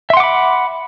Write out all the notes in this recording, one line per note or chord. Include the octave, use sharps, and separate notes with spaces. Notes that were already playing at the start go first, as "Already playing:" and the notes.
E5 F#5 B5 C6 D6